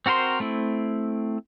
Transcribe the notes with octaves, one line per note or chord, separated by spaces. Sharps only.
C4 F#4 A#4 C5 C6
A3 C4 E4